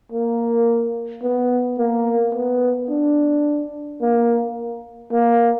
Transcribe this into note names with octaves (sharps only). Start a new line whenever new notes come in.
A#3
B3
A#3
B3
D4
A#3
A#3